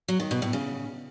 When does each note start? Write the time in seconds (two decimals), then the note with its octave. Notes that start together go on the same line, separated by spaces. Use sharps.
0.08 F#3
0.20 D#3
0.31 B2
0.42 A2
0.53 C#3